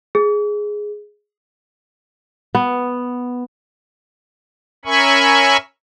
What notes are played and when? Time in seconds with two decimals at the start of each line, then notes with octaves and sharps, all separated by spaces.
0.15 G#4
2.55 B3
4.85 C#4 A#4 E5 G#5 B5 C#6